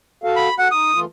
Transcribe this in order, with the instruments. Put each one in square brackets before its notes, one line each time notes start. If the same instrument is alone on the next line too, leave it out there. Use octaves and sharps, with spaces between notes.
[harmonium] F#4 A4 F5
[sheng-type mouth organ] B5
[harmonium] F#4 A4 [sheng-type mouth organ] F#5
[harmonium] D#4 [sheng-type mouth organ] D#6
[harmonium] E3 A3 F4